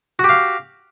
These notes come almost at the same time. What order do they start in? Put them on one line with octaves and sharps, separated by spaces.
F#4 G4 F5